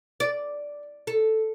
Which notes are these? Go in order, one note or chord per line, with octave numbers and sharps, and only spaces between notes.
D5
A4